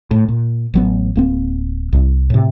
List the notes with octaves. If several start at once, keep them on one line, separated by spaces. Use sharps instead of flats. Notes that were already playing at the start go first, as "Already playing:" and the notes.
A2
A#2
A1 F#3 B3
D1 A#3 C4
C2
A2 C3